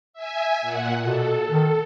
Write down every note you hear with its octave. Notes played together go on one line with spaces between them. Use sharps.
E5 G#5
A#2 F#5
B2 A4
D#3